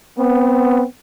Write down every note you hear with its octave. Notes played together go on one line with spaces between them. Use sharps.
B3 C4